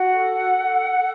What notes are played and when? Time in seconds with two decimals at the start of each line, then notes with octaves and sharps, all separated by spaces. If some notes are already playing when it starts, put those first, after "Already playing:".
Already playing: F#4 F#5
0.13 A4
0.57 A4
0.99 A4